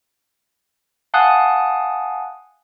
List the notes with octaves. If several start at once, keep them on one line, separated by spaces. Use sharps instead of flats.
F5 F#5 G#5 A5 D#6 F#6